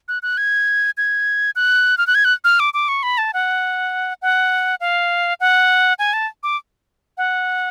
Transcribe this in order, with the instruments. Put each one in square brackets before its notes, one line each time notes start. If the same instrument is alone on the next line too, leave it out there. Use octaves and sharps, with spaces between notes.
[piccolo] F#6
F#6
G#6
G#6
F#6
F6
F#6
G#6
F#6
F6
D6
D6
C#6
B5
A5
F#5
F#5
F5
F#5
G#5
A5
D6
F#5